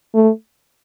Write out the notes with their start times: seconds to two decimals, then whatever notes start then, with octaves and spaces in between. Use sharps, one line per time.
0.14 A3